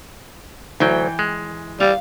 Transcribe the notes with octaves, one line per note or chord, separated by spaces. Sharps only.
D2 E3 F#3 G5
G#3
G3 F5